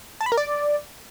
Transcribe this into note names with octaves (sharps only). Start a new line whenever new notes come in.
A5
B5
A#4
D5